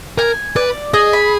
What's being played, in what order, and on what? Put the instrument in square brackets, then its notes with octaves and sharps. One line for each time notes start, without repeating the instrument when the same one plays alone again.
[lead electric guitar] A#4 [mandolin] G#5
[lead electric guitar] B4 [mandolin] D5
[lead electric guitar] G#4 [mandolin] D#5
[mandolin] B5